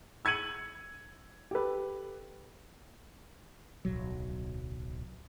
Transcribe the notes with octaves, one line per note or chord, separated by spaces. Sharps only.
E6 G#6 C#7 D#7 F#7
G4 A4 B4
D1 B1 F#3